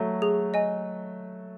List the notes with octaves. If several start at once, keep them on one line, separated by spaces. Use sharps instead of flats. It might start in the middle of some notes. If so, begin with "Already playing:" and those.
Already playing: F#3 A3
G#4
D#5 G#5